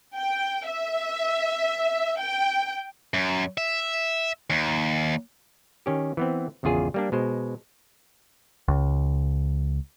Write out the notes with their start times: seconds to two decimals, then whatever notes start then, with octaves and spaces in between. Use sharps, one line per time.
0.16 G5
0.68 E5
2.20 G5
3.14 F#2
3.58 E5
4.50 D#2
5.86 D#3 C#4 G4
6.17 E3 B3 C4
6.63 G#1 E2 C#3 F4 G#4
6.94 G3 A#3 D4
7.12 B2 G#3 C5
8.68 C#2